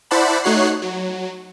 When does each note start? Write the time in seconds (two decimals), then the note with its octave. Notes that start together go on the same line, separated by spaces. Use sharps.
0.11 E4 C5 D5 F#5 A5 B5
0.43 A3 D#4 F#4 C#5 F#6 C7
0.82 F#3